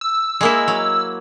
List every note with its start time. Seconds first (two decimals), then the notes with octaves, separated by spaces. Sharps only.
0.01 E6
0.41 G#3 A#3 E4
0.68 F#3